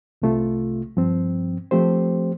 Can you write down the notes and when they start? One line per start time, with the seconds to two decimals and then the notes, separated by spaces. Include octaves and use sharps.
0.22 C2 C3 A3 F4
0.97 G2 F3 C4
1.71 F3 A3 C4 G4 C5